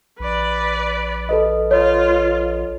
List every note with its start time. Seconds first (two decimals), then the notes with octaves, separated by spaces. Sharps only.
0.20 A#1 B4 D5
1.29 A4 B4 D#5
1.71 F4 C#5